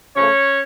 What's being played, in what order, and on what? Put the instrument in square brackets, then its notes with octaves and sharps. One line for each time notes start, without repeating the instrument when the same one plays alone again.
[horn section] C#3 F3 A3 C#4 C#5